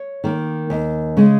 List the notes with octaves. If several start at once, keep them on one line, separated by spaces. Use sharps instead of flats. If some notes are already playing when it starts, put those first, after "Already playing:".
Already playing: C#5
D#3 A#3
D#2
C#3 G#3